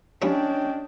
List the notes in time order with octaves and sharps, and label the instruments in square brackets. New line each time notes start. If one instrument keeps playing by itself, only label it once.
[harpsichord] F3 G3 [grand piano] C#4 [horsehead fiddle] D4 [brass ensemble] C#5 D#5 G5